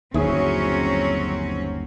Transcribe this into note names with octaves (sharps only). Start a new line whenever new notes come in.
G1 D#2 F#3 C4 C#4 E4 G#4